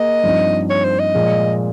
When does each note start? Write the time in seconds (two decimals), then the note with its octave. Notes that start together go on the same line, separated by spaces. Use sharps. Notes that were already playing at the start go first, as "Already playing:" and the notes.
Already playing: A#3 G#4 D#5
0.23 G2 F3 C4 D#4
0.70 C#5
0.84 C5
0.99 D#5
1.15 A#2 F3 G#3